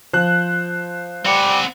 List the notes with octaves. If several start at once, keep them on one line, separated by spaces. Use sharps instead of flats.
F3 C5 F#6
G3 C4 F#5